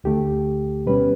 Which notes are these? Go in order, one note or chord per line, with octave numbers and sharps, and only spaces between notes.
D2 D3 A3 G4
B2 G3 C#4 B4